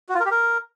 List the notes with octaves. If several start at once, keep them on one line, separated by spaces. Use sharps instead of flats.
F#4
F4
A#4
G4
A#4